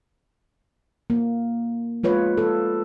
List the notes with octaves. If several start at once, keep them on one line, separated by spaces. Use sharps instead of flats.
A#3
G#3 F4 B4 C#5
A4